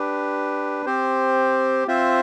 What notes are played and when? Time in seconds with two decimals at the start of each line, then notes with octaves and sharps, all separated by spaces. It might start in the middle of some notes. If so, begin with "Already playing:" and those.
Already playing: D4 G4 B4
0.86 C4 G4 C5
1.88 C4 F4 C5 E5